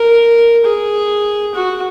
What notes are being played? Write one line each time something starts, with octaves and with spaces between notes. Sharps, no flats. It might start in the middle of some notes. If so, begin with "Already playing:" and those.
Already playing: A#4
G#4
F#4